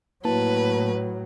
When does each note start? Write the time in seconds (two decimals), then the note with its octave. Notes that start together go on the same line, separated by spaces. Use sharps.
0.25 A2 F#3 A#3 E4 B4 A5